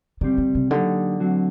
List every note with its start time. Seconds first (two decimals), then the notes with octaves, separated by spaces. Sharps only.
0.21 D3 G3 C4 G4 D5
0.38 D3
0.55 C3
0.70 D3 F#3 A#3 D#4 G4
1.20 F#3 A3 C4 F#4